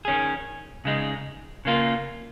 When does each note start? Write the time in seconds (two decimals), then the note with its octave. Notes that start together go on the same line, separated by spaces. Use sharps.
0.05 D#3 C#4 G#4
0.85 C#3 G#3 D#4
1.65 C#3 A#3 F4